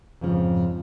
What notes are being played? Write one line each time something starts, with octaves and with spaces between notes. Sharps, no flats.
F2 G#2 C#3 F3